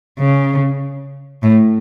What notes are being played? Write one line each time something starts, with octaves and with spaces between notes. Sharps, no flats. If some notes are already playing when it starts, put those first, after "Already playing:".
C#3
A2